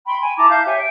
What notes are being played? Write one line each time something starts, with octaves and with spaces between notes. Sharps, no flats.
G5 B5 C6
G5 G#5
E4 A5 A#5 D6
E5 F5 A5 G6
G4 C#5 E5 G#5
G5